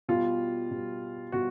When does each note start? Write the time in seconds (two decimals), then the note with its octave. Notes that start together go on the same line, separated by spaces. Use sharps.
0.08 B2 G3 F4
0.71 B2 G3
1.32 B2 G3 F#4